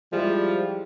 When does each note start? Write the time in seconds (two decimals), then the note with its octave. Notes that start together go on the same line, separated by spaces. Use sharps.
0.13 F3 G3 G#3 E4